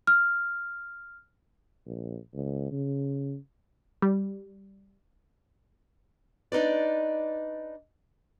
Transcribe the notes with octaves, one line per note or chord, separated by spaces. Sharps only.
F6
A#1
C#2
C#3
G3
D4 D#4 B4 D5